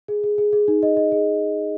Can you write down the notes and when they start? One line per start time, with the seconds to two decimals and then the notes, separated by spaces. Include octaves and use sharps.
0.08 G#4
0.23 G#4
0.38 G#4
0.53 G#4
0.68 D#4
0.83 D#5
0.97 D#5
1.12 G#4